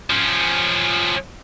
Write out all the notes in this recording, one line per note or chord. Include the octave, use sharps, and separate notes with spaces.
F3 C#4